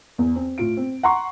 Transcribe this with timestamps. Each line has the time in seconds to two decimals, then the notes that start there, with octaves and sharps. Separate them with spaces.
0.18 E2
0.36 C4
0.58 A2 F4 D7
0.77 C4
1.03 F#5 A#5 C6 C#6